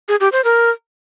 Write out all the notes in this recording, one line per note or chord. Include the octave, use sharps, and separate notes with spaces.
G#4
G4
C5
A#4